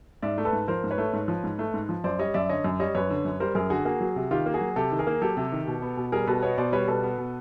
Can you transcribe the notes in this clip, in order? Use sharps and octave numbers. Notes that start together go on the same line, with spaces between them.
G#2 D5 E5
A3
A4 B4
G#2
F3 A#4 C5
G#2
B4 C#5
A3
G#2
F3
G#2
A3
G#2
F3
F#2 C5 D5
G3 C#5 D#5
F#2 D5 E5
D3 C#5 D#5
F#2
G3 C#5 D#5
F#2 B4 C#5
D3
F#2
G3 A#4 C5
F#2 G#4 A#4
D3 F#4 G#4
A#3 F#4 G#4
F#3
C3
D#3 F4 G4
A#3
F#4 G#4
F#3
C3 G4 A4
D#3
G#4 A#4
A#3
F#3 G4 A4
C3
D#3
B2
B3
B2
G3 G#4 A#4
B2 A4 B4
B3 C#5 D#5
B2 C5 D5
G3 B4 C#5
B2 A4 B4
B3
B2